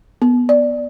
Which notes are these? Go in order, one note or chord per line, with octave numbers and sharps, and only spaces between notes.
B3
D5